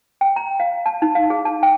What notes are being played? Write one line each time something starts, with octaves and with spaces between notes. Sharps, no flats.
G5
A#5
F5
A5
D#4
F5
G#4
A5
G5